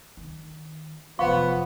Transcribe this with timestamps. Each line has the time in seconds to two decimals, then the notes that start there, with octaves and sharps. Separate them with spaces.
0.17 D#3
1.19 F1 F#2 F3 B3 F5 C6 C#6